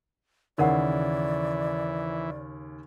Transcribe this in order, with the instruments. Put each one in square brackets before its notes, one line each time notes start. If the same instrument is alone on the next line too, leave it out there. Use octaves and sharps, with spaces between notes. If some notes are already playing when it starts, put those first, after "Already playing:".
[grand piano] D#2 C#3 [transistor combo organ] E3 [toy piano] D#4 A#4 F#5 [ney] D5